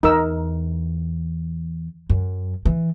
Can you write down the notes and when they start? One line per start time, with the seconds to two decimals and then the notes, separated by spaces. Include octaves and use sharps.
0.03 E2 D#4 A#4 E6
2.09 F#2
2.65 E3